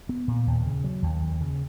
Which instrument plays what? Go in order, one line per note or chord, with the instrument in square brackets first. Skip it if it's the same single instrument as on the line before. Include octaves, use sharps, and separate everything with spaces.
[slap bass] B3
A#2
D#2
C#3
F#3
D#2
D#2
C#3